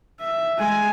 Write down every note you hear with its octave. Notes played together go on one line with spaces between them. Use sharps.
E5
G#3 G#5